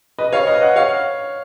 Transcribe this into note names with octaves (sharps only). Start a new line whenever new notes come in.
B4 D#5
C#5 F5
B4 D#5
D#5 F#5
C#5 F5